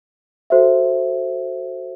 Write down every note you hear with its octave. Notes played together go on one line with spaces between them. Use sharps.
F#4 A4 C5 E5